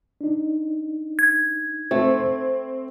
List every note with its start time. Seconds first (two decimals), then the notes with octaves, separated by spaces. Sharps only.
0.21 D4 D#4
1.19 G#6
1.91 A3 C4